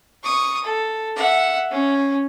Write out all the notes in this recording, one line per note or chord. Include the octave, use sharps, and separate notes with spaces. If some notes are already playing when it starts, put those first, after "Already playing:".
C#6 D#6
A4
E5 F#5
C#4